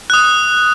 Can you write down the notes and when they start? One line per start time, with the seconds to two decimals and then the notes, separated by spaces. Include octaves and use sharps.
0.10 D#6 F#6